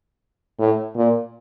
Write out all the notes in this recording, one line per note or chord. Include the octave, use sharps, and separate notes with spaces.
A2
A#2